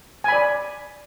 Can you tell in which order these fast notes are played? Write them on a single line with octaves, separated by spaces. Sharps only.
G#5 B5 D5